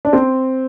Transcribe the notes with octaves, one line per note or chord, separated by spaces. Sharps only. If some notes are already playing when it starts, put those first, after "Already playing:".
D4
C4